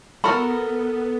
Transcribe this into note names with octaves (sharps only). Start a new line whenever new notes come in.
B3 F#4 A4 A#4 B5